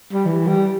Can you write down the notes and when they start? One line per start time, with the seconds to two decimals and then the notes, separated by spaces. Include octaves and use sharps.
0.13 G3
0.26 E3
0.47 G3